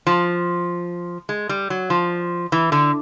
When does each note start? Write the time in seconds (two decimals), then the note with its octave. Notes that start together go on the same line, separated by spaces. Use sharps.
0.07 F3
1.29 G#3
1.49 G3
1.70 F#3
1.90 F3
2.52 E3
2.72 D3